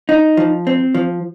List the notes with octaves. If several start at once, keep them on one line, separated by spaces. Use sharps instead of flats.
D#4
F3
C4
F3